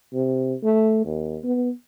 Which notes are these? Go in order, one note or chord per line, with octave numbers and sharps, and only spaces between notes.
C3
A3
D#2
B3